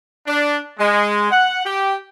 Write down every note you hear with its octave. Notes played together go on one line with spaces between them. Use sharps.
D4
G#3
F#5
G4